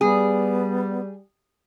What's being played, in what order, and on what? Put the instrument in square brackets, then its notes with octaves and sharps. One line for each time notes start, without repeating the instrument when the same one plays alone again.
[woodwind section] G3 [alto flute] B3 [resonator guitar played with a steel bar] G#4